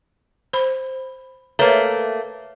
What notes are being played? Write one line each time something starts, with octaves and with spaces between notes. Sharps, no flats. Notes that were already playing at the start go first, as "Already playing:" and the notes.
C5 B5
A3 A#3 B4 C#5 A#5